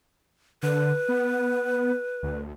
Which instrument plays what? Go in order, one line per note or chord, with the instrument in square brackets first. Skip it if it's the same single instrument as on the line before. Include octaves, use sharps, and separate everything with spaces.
[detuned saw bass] D3 [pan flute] B4
[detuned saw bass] B3
D2